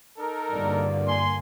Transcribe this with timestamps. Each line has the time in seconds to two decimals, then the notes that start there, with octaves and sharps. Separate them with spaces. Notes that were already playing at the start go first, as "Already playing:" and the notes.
0.18 D#4 A4 A#4
0.51 E2 G2 D3 A#3 F#4 D5
1.08 G#5 C6